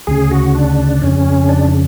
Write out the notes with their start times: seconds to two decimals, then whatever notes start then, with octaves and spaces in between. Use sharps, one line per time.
0.07 D2 C#3 G#4
0.31 F#4
0.55 D4
1.02 F2 C#3 C#4
1.49 D4